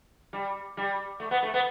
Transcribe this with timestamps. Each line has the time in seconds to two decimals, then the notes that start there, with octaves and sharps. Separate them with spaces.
0.33 G3
0.77 G3
1.20 A3
1.31 B3
1.43 A3
1.54 B3